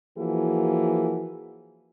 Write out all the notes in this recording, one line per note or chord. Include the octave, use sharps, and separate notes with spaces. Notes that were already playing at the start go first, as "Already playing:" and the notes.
E3 F3 A#3 F#4 G#4